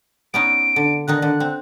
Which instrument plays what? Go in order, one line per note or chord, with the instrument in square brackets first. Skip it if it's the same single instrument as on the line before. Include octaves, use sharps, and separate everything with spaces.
[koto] B3 C#4 D#4 [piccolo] D7
[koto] D3
[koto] D3 D#3 D#4 [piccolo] F#6
[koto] D3
C4